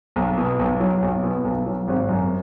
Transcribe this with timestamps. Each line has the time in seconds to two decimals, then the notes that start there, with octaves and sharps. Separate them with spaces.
0.16 B1
0.38 B2
0.59 B1
0.80 F#3
1.02 B1
1.23 B2
1.45 B1
1.66 F#3
1.88 G#1
2.09 F#2